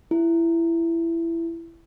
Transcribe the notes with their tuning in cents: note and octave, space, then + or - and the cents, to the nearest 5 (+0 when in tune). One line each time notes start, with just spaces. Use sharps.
E4 +15